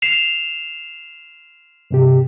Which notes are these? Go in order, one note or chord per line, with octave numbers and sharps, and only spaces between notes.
C7 E7 F7
G2 C3 G4